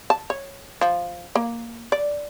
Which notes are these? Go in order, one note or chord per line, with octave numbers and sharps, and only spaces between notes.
A5
C#5
F3
A#3
D5